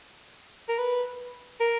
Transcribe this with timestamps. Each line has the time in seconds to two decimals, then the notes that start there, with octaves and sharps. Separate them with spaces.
0.69 A#4
0.79 B4
1.60 A#4